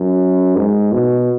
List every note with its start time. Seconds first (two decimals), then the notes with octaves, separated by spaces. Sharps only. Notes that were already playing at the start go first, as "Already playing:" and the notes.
Already playing: F#2
0.56 G#2
0.92 B2